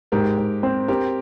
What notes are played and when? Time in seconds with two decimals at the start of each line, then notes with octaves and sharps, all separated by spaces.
0.12 G#2 G4 A#4
0.38 G#2
0.63 C4
0.88 C4 G4 A#4